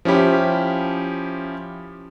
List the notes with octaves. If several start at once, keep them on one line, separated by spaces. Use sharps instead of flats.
F3 C#4 E4 G4 B5